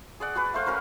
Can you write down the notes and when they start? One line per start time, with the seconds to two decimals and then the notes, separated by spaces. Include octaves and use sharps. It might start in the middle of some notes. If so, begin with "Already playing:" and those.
0.20 G#4 D5 F#5
0.35 F#4 G#4 B4
0.54 A3 C5 F5
0.66 C#4 F#4 A#4 B4